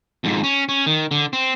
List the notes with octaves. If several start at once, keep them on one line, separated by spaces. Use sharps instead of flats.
F2 G#2
C#4
C#4
D#3
D3
C4